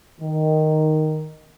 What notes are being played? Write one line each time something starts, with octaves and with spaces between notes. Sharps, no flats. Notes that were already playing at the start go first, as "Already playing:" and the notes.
D#3